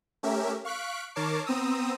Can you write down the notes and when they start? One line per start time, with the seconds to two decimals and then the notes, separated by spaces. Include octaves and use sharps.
0.23 A3 C#4 G4 A#4 E5
0.65 F5 C#6 F#6 B6 D7
1.15 D#3 A#4 C#5 A5 D6 C7
1.46 B3 C4 A#5 D#6 E6